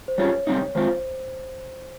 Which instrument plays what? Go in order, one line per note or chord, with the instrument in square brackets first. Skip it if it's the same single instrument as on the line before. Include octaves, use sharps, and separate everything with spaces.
[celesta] C5
[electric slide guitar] G3 C#4 F4 G#4 [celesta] C#5
[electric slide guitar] C3 G3 C4 D#4
[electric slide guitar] D#3 G#3 C4 F4 [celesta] C5